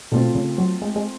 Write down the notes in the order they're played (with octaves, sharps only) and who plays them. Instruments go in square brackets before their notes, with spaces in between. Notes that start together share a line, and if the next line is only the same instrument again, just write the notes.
[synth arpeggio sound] B2 [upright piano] A3 C4 F4
[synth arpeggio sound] C#3
F#3
G#3
G#3